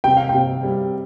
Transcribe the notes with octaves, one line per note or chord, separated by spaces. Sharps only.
C3 G5
F5
G5
C3
G3